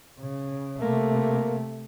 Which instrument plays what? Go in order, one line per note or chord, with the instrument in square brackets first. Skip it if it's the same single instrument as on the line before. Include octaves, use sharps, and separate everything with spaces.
[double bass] C#3
[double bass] C3 A3 [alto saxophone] A#3